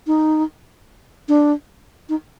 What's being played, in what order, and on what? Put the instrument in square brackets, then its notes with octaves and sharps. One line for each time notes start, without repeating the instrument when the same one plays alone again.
[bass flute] D#4
D4
D#4